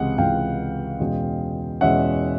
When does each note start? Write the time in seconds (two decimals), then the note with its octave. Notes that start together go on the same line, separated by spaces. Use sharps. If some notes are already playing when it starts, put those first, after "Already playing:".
Already playing: C#2 C3 E3 G#3 F#5
0.18 C#2 C3 E3 G#3 F5 G5
0.99 E2 B2 G#3 C#4
1.81 E2 B2 G#3 C#4 E5 F#5